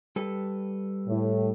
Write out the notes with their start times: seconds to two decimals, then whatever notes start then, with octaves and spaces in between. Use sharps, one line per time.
0.16 G3 A4 B4
1.07 A2